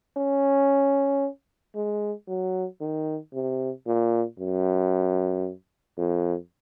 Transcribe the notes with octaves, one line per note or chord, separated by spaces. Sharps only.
C#4
G#3
F#3
D#3
C3
A#2
F#2
F2